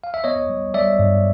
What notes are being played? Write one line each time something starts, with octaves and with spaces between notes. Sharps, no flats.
F5
E5
B3 C#5 D#5
G3
G3 D5 E5
G2